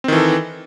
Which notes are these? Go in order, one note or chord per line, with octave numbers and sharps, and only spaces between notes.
D#3 E3 C4 A4